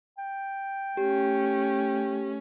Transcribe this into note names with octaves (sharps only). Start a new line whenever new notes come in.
G5
A3 C#4 G4